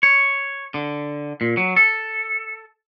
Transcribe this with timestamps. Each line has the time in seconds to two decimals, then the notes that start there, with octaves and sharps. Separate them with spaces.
0.03 C#5
0.74 D3
1.41 A#2
1.57 F#3
1.76 A4